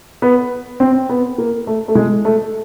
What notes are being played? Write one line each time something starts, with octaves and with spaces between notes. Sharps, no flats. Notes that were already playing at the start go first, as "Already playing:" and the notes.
B3
C4
B3
A#3
A3
A3
G#3
A3